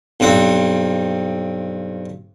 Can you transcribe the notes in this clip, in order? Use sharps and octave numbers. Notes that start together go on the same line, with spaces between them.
B1 G2 C4 F#5